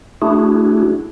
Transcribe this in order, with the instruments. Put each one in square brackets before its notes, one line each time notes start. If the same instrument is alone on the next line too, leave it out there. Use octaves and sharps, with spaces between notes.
[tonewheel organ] A3 D4 E4 F#4 G#4